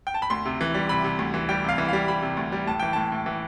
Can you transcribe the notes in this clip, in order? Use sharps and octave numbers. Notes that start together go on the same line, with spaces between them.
G5
A5
B5
D2 C6
C3
E3
G3
C3 B5
C3
D2
E3
G3 G5
C3 F5
E3
G3 F5
G3 B5
C3
D2
G3
A2 A5
E3 G5
A2 A5
A2
E3